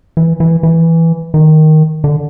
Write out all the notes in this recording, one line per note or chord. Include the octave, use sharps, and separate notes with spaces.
E3
E3
E3
D#3
D3